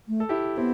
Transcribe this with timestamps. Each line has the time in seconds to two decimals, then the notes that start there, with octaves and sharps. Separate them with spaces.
0.08 A3
0.20 A4
0.29 E4 G4
0.57 B3 C4 E4